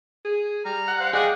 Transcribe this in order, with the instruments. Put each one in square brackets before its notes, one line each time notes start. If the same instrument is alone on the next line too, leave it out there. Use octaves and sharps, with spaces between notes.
[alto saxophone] G#4
[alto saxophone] G3 [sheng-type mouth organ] A#5 F6
[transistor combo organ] F#5
[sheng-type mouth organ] C5 F5
[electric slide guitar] G#4 [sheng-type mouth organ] D5 D#5 G5 [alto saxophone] F5